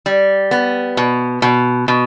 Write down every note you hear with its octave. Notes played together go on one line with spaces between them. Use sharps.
G3
B3
B2
B2
B2